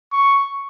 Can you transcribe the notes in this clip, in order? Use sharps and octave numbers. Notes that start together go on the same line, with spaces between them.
C#6